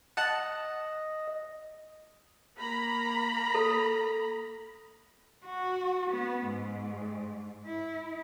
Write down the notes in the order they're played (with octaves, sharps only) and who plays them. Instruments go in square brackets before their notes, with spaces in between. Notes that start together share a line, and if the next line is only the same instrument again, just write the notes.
[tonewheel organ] D#5 [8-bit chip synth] F#5 A5 F#6
[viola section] A#3 A#5 B5
[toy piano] A4
[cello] F#4
B3
G#2
E4